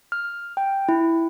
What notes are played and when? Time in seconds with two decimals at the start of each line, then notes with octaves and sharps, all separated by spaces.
0.12 F6
0.57 G5
0.89 E4